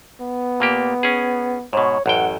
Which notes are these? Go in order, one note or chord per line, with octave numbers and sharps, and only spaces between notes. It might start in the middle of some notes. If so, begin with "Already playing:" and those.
B3
A#2 A#3 G4
C#4 G#4
G#2 B2 C#5
A1 F#2 F#5 G5